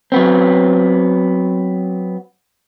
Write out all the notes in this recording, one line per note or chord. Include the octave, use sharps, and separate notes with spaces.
F#3 B3 C4